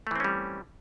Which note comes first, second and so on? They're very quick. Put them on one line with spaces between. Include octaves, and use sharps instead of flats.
A3 E3 C4 C#4 G3